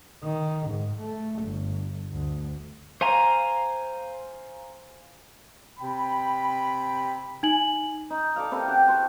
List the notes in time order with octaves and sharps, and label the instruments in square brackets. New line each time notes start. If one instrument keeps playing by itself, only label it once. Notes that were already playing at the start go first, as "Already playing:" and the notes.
[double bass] D#3
G#2
A3
G1
D2
[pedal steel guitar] C5 F5 G#5 A#5
[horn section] C3 G5 B5
[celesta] D#4 G#5 F#7
[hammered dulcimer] D#4
A4 D5 F5
C3 E4 A4 A#4
G4 A4 F#5 G5
C5 A5 C#6